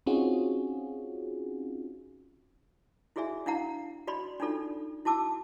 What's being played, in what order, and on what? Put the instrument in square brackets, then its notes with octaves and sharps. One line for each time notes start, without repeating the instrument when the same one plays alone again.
[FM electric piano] C4 C#4 D#4 F4 F#4 G#4
[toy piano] E4 F#4 G#4 D5 E5 G#5
D4 E4 F5 F#5 A#5
F#4 D5 B5 C6
D4 D#4 F4 A4 D5
E4 F#4 A5 D6 E6